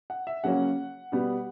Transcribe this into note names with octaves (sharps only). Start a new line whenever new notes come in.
F#5
E5
C#3 F#3 A#3 C#4 F#5
B2 G3 B3